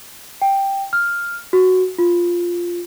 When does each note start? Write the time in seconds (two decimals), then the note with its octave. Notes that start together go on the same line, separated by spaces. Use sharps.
0.42 G5
0.93 F6
1.53 F#4
1.99 F4